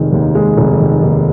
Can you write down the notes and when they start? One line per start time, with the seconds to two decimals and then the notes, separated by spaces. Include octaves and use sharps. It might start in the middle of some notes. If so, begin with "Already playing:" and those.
Already playing: F1 D#3 G#3
0.12 D#2
0.35 G#3
0.57 F1
0.80 D#3
1.02 D#2